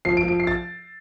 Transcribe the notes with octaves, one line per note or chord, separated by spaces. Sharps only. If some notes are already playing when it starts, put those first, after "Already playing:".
F3 C7
D7
F3
D7
C7
A6